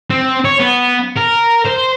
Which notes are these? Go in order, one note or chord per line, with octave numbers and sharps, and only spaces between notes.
C4
C#5
B3
A#4
C5